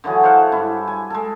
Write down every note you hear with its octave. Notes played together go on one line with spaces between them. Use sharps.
D3 E3 F#3 G#4
C5 F5 F#5
G2 E4
G#5
G#3 A4